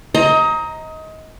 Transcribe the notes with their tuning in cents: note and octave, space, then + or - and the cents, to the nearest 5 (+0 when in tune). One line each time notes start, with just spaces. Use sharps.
C5 +30 D#5 +25 A#5 +0